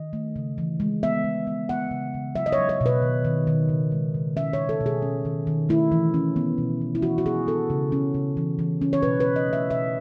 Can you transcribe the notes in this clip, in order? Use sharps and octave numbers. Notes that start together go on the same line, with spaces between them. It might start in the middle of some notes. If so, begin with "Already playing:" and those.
Already playing: D#3 D#5
A3
C#3
E3
G#3
B3 E5
G#3
B3
B3 F#5
C#3
C#3
F#3 E5
D#5
C#5
F#3
C#5
B2 B4
D#3
D#3
D#3
C#3
G#3
C#3
C#4 E5
B2 C#5
A4
B2
G#4
C#4
D#3
D#3
A3 E4
E3
C#4
B3
B2
B3
E4
E3 F#4
F#4
B3 G#4
B3 A4
C#3
C#4
C#3
E3
E3
C#4
C#5
B2 B4
B4
C#4
D#5
A3 E5
B2 E5